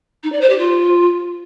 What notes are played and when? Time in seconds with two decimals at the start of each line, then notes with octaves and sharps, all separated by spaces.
0.23 D#4
0.32 D5
0.41 C5
0.50 G4
0.58 F4